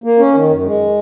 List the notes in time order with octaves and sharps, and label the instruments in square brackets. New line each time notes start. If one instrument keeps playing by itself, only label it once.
[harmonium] A#3
C#4
D#3
F#2
G#3